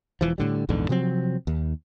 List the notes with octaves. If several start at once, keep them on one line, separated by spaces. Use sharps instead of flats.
E1 E3 F3
A2 D3 G3
A#1 E2 G#2 D3
C3 F3 F#3 C4
D#2